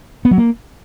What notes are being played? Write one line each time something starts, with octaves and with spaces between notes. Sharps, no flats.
B3
F#3
A#3